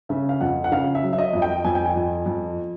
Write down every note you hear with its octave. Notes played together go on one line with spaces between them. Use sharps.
C#3 E5
F5
F2 F#5
F#5
C#3 F5
E5
F#3
E5
D#5
F2
G5
F2 G#5
G5
G#5
F2
F2